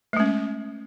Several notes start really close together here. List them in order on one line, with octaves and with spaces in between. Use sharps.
A3 G#3 C#4